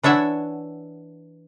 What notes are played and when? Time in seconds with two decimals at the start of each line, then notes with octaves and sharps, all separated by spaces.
0.03 E3 D4 C#5 E5 F#5